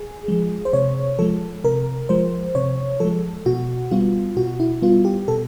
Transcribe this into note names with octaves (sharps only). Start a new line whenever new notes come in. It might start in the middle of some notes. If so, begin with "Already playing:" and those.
Already playing: G#4
F3 G#3
C5
C3 C#5
F3 G#3 A4
C3 A#4
F3 G#3 C5
C3 C#5
F3 G#3 A4
B2 F#4
G3 B3 F4
B2 F#4
E4
G3 B3 F4
G4
B2 A4